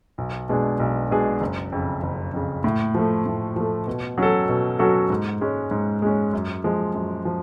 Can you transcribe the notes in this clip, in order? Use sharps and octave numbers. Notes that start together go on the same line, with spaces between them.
B1
B2 G#3 D4 G#4
B1
B2 G#3 D4 G#4
F#1
F2 C#3
F#1
F2 C#3
A2
F3 A3
A2
F3 A3
B2
F#3 C#4 F#4 A4
B2
F#3 C#4 F#4 A4
G#2
G#3 C#4
G#2
G#3 C#4
F#2
F3 G#3
F#2
F3